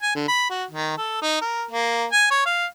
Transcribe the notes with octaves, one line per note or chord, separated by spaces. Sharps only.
G#5
D3
B5
F#4
D#3
A4
D#4
A#4
A#3
G#5
C#5
F5